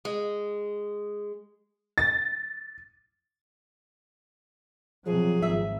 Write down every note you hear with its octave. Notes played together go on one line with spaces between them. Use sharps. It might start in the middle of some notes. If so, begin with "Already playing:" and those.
G#3
A6
C3 F3 F#3 G#4
G#1 E5